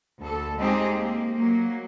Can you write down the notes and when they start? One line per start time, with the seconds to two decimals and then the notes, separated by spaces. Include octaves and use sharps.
0.20 D2 A4
0.58 G#3 A3 C4 D#4 G4 G#4
0.90 A#3
1.36 F#3 A#3